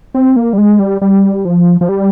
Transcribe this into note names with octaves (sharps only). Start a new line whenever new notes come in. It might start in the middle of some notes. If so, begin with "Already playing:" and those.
C4
A#3
G3
G#3
G3
G3
F3
F3
G3